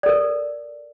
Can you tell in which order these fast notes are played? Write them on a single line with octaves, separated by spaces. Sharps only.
D5 A4 A#4